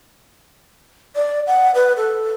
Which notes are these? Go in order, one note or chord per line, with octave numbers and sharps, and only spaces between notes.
D5
F#5
B4
A4